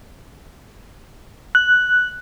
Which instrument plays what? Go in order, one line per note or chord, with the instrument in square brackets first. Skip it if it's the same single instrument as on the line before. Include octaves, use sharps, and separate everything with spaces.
[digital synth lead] F#6